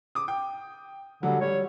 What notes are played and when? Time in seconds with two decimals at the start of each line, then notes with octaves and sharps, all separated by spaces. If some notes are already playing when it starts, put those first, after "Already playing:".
0.15 D6 D#6
0.28 G5
1.23 D3 F#3 G3
1.41 G3 C#5